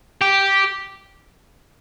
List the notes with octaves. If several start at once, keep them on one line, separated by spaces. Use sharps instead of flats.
G4